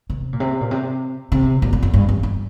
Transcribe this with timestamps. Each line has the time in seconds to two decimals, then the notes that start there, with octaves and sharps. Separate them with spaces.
0.10 C3
0.33 A#2
0.40 C3
0.61 A#2
0.71 C3
1.32 C3
1.62 A#2
1.73 A#2
1.83 F2
1.94 G2
2.09 F2
2.23 G2